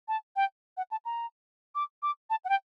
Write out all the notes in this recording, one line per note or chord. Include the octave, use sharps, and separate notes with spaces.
A5
G5
F#5
A5
A#5
D6
D6
A5
F#5
G5